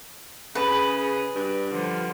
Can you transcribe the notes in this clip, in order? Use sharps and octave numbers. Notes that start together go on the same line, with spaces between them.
C#3 G#4 B4
G2
D3 F3 G3